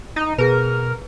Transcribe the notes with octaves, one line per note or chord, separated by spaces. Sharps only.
D#4 D#7
B2 G#4 A#4 B4